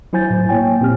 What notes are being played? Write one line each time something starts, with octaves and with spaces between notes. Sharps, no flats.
F#3 E4 C5 G#5 G6 A6
A2
A#3 E4 C#5 G5 G#5
A#2 C4 G4 F6